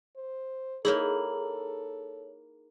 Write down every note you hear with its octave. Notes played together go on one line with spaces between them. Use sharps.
C5
A#3 D#4 E4 G#4 A4 C#5 F#7